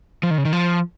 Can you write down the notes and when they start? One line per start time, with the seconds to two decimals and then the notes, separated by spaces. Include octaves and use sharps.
0.23 F3
0.31 D#3
0.38 C#3
0.45 D#3
0.53 F3